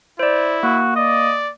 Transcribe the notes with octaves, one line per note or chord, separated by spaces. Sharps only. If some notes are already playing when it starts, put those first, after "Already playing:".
E4 C5 D5
A#3 F#4
D5 D#5